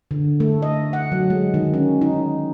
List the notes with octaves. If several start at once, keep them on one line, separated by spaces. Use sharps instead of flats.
D3
A3
D#5
F#5
F#3
G#3
D#3
C#4
D#4